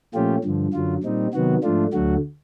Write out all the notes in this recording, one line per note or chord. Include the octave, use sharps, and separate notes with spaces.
A#2 F3 A3 C#4 F4 G4
G2 D3 F3
F#2 D3 F#3 F4
A#2 G3 C4 D#4
C3 D#3 F#3 B3 F#4
G#2 F3 A3 D4 F4
D2 D3 F#3 A3 F#4